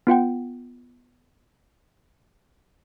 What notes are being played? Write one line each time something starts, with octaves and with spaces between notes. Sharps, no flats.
B3 F4 F#5 G5